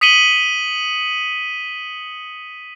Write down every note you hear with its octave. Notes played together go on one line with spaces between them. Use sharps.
D#6 B6 C#7 D#7 F#7 G7